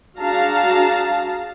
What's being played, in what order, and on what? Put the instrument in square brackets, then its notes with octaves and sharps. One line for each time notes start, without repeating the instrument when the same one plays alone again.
[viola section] D4 F#4 G#4 F5 A5 A#5